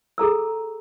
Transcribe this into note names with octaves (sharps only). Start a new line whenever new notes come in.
G#4 A4 A#5 E6